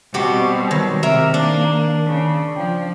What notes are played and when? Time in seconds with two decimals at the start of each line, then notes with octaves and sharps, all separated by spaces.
0.14 B2 G3 C4 F#4 G4
0.71 D#3 F#3
1.03 C3 G#3 A#4 E5
1.34 A#3 D4
2.06 C#3
2.56 F3 G5